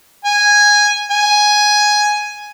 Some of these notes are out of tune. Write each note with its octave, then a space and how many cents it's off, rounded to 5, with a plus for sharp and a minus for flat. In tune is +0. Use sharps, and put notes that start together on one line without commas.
G#5 -10
G#5 +5